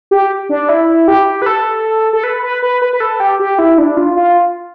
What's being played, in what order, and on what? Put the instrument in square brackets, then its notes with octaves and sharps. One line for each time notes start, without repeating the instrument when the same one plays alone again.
[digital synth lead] G4
D4
E4
G4
B4
A4
A4
B4
B4
B4
B4
B4
A4
G4
G4
E4
D4
F4
F4